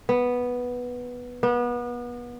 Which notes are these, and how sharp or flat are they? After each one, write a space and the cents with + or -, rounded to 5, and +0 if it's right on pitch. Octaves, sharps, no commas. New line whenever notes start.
B3 -5
B3 -30